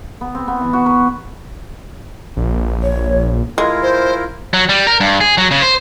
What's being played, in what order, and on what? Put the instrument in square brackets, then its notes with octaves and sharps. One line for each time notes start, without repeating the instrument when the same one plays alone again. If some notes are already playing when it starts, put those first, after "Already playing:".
[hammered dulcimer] B3
C4
B3
E3
F#4
B4
[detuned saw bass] A#1
[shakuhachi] C#5
[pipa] G#3 [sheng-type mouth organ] E4 F4 A#4
[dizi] C5
[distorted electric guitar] F#3
G3
A#4
G2
G#4
F#3
C#3
C5